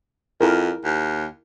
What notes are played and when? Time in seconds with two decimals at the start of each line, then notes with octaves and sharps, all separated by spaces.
0.41 F2 E4 G#4 A#4
0.85 D#2